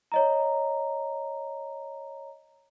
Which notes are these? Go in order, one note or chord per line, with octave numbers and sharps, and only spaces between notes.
C#5 D#5 A#5